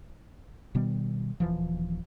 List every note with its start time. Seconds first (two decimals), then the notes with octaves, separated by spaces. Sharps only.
0.75 B2 D#3 G3 B3
1.40 D#1 E3 F3